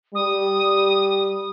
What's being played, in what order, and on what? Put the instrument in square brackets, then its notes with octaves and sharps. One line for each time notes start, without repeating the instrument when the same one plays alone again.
[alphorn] G3 [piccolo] D#6